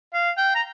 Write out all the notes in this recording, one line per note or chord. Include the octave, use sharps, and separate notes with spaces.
F5
G5
A#5